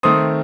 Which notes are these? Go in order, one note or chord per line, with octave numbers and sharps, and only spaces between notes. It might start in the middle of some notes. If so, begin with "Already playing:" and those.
D#3 A3 C4 C6 D#6